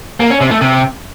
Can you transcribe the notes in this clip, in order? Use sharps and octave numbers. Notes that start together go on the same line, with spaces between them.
A#3
C#4
C3
A3
C3